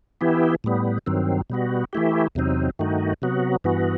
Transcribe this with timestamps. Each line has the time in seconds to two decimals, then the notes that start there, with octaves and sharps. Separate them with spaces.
0.21 E3 B3 E4 G4
0.64 A2 G3 B3
1.06 G2 D#3 F#3 C4
1.50 B2 G3 B3 F#4
1.93 E3 A3 E4 G4
2.35 E2 C3 F#3 C4 D#4
2.79 G2 D#3 A3 D#4 F#4
3.22 C3 F#3 B3 F#4
3.64 G2 E3 B3 F#4